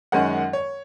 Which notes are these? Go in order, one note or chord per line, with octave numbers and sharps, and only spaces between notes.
F#2 D#3 G#3 C#4 F#5
C#5